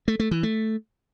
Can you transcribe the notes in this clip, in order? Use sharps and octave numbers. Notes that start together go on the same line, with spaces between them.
A3
A3
E3
A3